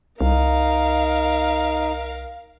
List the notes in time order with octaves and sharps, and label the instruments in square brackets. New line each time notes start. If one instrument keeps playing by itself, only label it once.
[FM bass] C2 [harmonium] D#4 [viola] A#4 F5